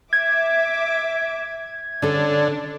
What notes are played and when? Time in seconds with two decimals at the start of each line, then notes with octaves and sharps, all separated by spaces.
0.13 E5 D6 G#6
2.02 D3 C#4 D4 A4